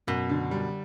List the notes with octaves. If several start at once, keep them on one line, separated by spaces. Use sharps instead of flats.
F#2 B2
D3
G3